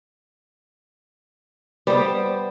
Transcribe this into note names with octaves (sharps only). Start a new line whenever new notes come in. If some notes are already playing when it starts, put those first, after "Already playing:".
G3 B3 C5 D5